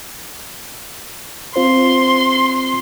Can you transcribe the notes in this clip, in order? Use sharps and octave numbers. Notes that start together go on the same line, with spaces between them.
C4 F4 C5 C6